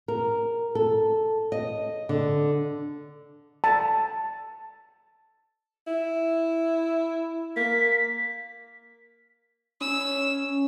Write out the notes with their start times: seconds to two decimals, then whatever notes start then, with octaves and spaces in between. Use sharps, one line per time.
0.08 A#4
0.75 A4
1.52 D#5
2.09 D3
3.64 A5
5.87 E4
7.56 A#3 B6
9.81 C#4 E6